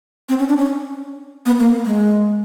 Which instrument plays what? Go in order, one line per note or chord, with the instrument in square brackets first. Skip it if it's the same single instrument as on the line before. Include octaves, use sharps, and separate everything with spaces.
[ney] C4
C#4
D4
C#4
B3
A#3
G#3